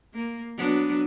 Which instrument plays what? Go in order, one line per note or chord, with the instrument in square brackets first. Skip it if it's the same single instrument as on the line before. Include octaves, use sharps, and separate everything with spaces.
[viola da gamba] A#3
F#3 B3 D4